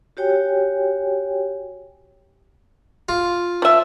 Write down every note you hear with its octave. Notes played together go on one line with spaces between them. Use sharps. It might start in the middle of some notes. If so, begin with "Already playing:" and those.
F#4 G4 C#5 G5 G#5
F4
F3 E5